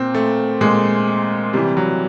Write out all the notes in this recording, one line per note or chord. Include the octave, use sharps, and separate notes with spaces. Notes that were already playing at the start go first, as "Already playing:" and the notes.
Already playing: A#2 C4
A3
A#2 G#3
C3 E3 G3
F#3